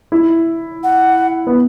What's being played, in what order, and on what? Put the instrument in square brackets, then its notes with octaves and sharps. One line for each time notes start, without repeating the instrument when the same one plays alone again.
[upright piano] E4
[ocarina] F#5
[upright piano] B3